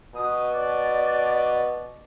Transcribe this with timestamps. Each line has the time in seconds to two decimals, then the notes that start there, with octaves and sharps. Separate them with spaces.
0.15 B2 D#6
0.54 D5